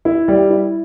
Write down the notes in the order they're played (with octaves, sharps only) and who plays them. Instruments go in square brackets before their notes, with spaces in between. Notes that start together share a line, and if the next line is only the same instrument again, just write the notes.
[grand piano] E4
G3
E4